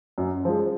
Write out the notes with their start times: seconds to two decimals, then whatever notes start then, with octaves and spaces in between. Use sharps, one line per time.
0.18 F#2
0.45 F3 G#3